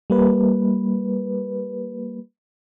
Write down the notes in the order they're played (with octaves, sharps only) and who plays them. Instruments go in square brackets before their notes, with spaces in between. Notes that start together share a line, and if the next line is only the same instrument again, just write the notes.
[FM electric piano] G3 A#3 B4